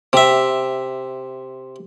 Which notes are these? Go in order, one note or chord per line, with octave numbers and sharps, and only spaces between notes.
C3 E5